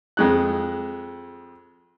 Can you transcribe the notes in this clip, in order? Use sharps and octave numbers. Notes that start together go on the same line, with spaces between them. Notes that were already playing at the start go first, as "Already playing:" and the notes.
F2 G#3 F#6